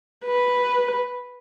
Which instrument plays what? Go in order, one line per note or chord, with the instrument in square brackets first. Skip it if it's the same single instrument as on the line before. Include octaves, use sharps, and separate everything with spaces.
[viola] B4